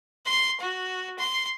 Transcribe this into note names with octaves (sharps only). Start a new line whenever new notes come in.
C6
F#4
C6